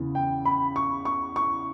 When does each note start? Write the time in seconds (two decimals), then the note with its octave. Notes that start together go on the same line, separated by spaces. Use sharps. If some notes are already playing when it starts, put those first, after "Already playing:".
Already playing: E2 C#3 E3
0.15 G5
0.45 B5
0.76 C#6
1.05 C#6
1.36 C#6